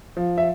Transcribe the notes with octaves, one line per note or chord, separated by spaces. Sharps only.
F3
E5